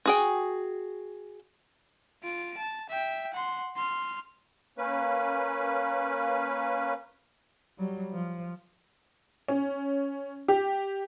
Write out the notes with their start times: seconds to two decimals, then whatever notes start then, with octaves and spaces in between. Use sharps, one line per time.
0.06 F#4 G#4 G5
2.23 F4 D7
2.58 A5
2.90 E5 G5
3.34 F#5 C6
3.76 C6 F6
4.78 A#3 C#4 B4
7.78 F#3 G3
8.12 F3
9.48 C#4
10.48 G4